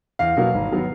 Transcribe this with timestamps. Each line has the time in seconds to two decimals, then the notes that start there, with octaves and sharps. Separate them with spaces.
0.19 E2 F5
0.37 B2 F#3 A#3
0.54 G#1
0.71 D#3 F#3 B3